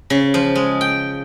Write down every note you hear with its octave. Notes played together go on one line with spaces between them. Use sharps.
C#3
F3
G#3
G5